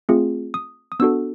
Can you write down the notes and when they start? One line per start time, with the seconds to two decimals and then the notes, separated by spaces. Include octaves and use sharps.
0.09 A3 C4 F4 G#4
0.54 D#6
0.92 D#6
1.00 B3 D4 F#4 A4 E6